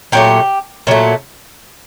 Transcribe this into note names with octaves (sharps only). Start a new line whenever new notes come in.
A#2 F#3 A3 G4
A#2 F#3 A3